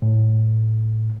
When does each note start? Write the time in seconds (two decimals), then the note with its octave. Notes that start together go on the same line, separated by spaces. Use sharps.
0.02 A2